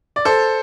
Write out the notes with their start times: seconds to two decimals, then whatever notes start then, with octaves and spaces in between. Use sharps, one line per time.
0.16 D5
0.25 A4 C5